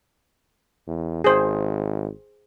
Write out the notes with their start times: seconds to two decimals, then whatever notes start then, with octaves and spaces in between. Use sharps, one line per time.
0.87 E2
1.24 G#1 G#4 C5